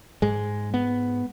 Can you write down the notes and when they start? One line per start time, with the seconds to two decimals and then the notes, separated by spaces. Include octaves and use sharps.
0.22 G#2 G#3
0.74 B3